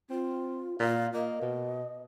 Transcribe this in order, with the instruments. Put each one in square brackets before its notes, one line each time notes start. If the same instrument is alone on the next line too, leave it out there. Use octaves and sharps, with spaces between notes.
[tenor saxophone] C4 [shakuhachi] F4
[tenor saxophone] A#2 [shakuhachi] F5
[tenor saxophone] A#3 [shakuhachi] D#5
[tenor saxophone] B2